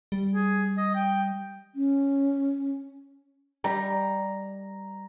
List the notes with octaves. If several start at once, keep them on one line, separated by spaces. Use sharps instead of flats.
G3
G#4
D#5
G5
C#4
G3 A#5